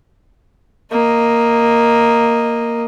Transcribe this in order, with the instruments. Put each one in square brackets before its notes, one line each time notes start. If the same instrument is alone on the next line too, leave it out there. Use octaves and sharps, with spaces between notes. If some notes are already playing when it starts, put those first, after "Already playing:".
[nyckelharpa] A#3 D#5